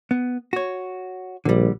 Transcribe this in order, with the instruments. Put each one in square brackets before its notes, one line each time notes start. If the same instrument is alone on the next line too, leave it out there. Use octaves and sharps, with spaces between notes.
[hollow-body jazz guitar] B3
F#4 C#5
[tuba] A#1 [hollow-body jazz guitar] D3 G3